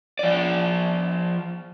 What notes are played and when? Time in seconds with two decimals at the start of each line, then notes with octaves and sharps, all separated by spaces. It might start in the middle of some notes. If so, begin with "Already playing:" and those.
0.19 F3 D5